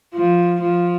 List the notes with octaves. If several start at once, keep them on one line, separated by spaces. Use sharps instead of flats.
F3
F3